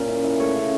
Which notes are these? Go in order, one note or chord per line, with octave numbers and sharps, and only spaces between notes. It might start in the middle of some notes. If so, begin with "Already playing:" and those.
Already playing: A#2 C#4 A#4 A#5
E4
E4
A3 C#5 C#6
C#3